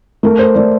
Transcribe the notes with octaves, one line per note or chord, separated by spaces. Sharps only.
A3 A#4
C5
A3 D5